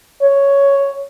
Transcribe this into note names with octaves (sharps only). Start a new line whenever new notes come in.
C#5